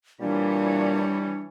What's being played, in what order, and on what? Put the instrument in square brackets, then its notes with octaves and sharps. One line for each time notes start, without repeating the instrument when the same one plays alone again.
[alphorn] A#2 [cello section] E3 C#5 [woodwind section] G3 [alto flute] D4